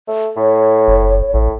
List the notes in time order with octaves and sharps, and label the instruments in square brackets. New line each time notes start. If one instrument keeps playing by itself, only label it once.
[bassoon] A3
[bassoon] A2 [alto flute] C#5
[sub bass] F#1
[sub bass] A1 [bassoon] A2